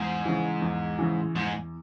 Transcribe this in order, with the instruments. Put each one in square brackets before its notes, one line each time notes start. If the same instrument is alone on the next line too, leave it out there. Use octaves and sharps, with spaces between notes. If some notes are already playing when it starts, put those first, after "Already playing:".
Already playing: [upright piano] E2 [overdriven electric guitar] G#2
[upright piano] C#3 E3
E2
C#3 E3
[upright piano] E2 [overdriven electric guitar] G#2